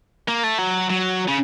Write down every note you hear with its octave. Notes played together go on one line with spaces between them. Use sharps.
A#3
A3
F#3
F#3
C#3